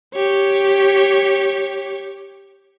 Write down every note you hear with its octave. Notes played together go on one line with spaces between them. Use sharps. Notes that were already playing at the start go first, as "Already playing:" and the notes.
G4 C#5